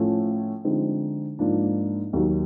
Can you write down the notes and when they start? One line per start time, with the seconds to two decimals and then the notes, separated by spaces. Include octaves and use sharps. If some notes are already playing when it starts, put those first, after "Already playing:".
Already playing: A2 F3 A3 C#4 F4
0.65 D3 F3 G#3 C4 D#4
1.39 G#2 F3 A#3 D4
2.13 D#2 D#3 F#3